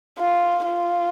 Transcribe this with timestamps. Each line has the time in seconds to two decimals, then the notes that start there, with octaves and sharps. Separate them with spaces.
0.19 F4
0.66 F4